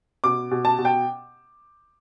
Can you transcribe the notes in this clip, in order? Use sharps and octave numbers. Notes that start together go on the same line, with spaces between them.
B2 D6
B2
A5
B2
G5